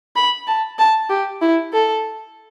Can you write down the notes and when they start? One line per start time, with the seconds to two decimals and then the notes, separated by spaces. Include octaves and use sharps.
0.16 B5
0.47 A5
0.79 A5
1.10 G4
1.41 E4
1.73 A4